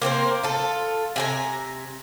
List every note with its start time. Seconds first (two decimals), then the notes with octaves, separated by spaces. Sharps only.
0.02 A#3 C4 A#4 C5
0.43 F4 A4
1.16 C3 G#5 A#5